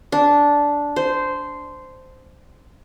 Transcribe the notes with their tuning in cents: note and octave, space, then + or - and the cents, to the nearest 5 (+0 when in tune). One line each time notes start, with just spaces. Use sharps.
D4 -10
C5 -10